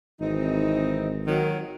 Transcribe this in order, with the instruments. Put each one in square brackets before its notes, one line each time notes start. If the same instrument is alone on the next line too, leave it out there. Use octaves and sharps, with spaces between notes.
[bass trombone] G#1 [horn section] E3 C4 D#4
[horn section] D#3 F#3